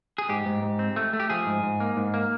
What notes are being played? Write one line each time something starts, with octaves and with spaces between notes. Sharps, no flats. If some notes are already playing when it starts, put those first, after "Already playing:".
G#4
G#2 G4
G#2
G#2
C4
A3
A3
G4
F3 G#4
G#2
G#2
A#3
G#2
A#3